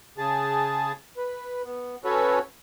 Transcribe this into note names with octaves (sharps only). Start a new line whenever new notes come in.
C#3 G#4 A5
B4
B3
C#4 F#4 A4 B4 C#5